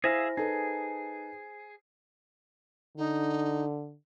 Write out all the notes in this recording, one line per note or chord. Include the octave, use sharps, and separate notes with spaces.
E4 G#4 C5 E5 F5 G#5 A#6
D#4 G#4 A4 B4
D3 D#4